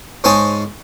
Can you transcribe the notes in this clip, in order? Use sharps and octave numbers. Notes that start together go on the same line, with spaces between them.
G#2 C5 C#5 G#5 A5 D#6